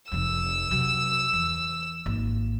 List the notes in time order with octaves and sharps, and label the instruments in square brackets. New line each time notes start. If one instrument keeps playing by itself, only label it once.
[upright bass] F1 F2 [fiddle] E6
[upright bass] C3 F#3
E2
G#1 A#3